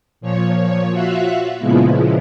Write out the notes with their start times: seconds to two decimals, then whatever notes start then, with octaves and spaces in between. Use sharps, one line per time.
0.21 A#2 F3 C#5
0.91 F4 F#4 E5 F5 F#6
1.59 A#2 C#3 F3 G#3 B3 E4